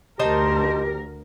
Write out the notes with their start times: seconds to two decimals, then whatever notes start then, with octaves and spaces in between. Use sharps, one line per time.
0.19 D2 D#4 G4 A#4 C5 A5